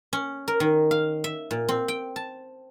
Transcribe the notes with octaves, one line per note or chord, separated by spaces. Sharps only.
C#4
A#4
D#3
F5
E5
A#2
C4
G5
A5